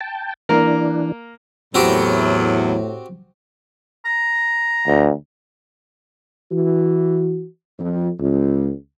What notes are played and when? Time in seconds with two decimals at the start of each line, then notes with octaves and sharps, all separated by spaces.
0.01 G5 A5
0.49 E3 A#3 D4 A#4
1.75 E2 A2 F#3 C4 F#4 G4
4.05 A#5
4.88 D2
6.52 E3 F#4
7.79 F2
8.20 C#2